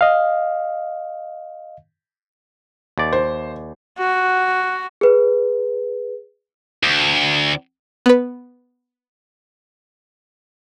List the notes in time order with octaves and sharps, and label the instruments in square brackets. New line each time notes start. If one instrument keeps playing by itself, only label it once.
[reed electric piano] D#5 F5
[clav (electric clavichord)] D#2 D5
[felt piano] C5
[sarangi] F#4
[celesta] G#4 B4
[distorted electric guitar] D2
[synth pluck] B3 B4